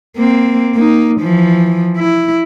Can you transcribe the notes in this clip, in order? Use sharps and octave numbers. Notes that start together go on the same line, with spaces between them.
A#3 C4
A#3 D#4
E3 F3
E4